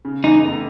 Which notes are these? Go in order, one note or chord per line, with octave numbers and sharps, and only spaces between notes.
C#3
E2 D#4
F1